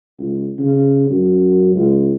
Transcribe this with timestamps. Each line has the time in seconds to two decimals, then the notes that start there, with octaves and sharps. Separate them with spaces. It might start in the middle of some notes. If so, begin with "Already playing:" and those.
0.19 C#2
0.59 C#3
1.10 F#2
1.74 C#2